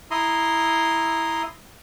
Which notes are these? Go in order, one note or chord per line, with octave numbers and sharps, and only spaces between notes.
E4 A#5 C6 D#6